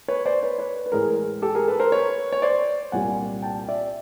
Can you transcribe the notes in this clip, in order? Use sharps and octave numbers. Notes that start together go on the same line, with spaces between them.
B4 C#5
C5 D5
B4 C#5
B4 C#5
B4
A2 E3 G#3 G#4 A#4
G4 A4
G#4 A#4
A4 B4
A#4 C5
B4 C#5
C#5
C5 D5
C2 A#2 G3 F#5 G#5
G5 A5
D5 E5